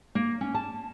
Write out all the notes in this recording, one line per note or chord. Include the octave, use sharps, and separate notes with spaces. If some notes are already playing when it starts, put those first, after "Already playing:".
A#3
C#4
A5